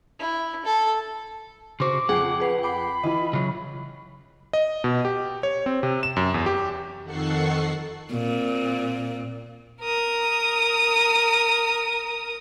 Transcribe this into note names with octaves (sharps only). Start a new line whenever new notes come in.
E4
A4
C#3 F#4 C5 C6 D6
F2 G#4 F#5 G5 C7
G#4 B4 C7
G5 B5 D6 C7
E3 E4 F4 D#5
C#3 F#3
D#5
B2
G4
C#5
C4
C3
E7
F#2
E2
G4
F2 D#3 A4 F#5 C#6 C7
A#2 C4
A#4 D#6